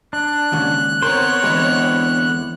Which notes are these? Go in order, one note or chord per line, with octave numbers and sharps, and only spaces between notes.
D4 F#6
D#2 G#2 C#3
B3 C4 A#4 C5 C#5
E2 D3 G#3 B3 E4